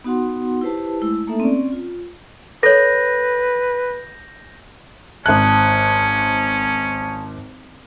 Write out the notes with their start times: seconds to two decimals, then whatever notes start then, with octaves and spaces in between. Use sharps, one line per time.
0.04 B3 D#4 F#4 F#5 C6
0.61 E4 G4 B4 C5 A5
1.01 G#3 A3 E4 E6
1.27 A3 A#3 D#4 A4 E5
1.40 C4 C#4 D5
1.72 F4
2.63 A4 B4 C#5 G6 A#6
5.26 G#1 C#4 A5 D#6 F#6